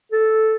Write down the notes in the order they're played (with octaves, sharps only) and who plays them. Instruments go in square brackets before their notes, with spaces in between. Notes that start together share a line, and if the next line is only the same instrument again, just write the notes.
[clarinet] A4